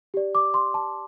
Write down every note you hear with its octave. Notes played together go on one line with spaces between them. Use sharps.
G4 D5
D6
C6
A5